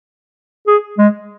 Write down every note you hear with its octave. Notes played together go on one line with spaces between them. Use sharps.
G#4
G#3